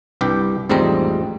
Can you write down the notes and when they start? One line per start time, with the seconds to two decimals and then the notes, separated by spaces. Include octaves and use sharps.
0.21 C2 G2 G4 G5
0.69 A1 F2 G#2 G3 C4 A#5